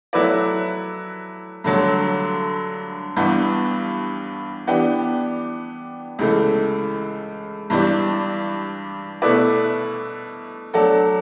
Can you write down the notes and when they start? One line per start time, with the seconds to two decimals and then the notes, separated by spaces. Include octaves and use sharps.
0.13 F#3 A3 E4 B4 D5
1.64 G2 D3 F#3 A3
3.16 G2 E3 G3 B3
4.67 E3 B3 D4 G4
6.19 C#2 C#3 E3 A3
7.70 G2 E3 G3 D4
9.22 B2 A3 E4 B4 D5
10.74 F#3 A3 D4 A4